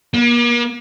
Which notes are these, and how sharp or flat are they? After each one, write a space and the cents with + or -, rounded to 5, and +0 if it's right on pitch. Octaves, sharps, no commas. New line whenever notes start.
A#3 +40